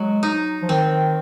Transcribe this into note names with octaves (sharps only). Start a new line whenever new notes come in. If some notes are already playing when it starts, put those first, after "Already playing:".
Already playing: F#3 G#3
D#4
F3
D#3 C4